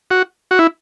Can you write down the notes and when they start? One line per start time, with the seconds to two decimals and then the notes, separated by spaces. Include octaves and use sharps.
0.11 F#4
0.51 F#4
0.59 E4